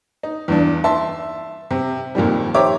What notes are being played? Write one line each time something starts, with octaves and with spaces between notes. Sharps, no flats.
D#4
E2 G2 D4
E5 A5 C6
C3
F2 A#2 D#3 G3
G4 C5 C#5 E5 A#5 D6